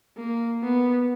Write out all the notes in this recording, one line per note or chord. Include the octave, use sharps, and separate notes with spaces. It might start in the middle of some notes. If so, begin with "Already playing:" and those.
A#3
B3